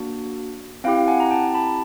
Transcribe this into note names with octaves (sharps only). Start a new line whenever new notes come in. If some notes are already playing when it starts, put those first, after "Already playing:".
Already playing: A#3 D4 F#4
C4 E4 G4 F5 G5
F#5 G#5
A#5
G5 A5
A5 B5